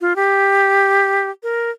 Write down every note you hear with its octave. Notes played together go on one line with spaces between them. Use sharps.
F4
G4
A#4